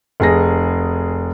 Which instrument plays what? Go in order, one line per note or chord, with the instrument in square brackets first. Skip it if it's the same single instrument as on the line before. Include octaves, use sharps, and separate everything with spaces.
[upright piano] F1 G#4 A#6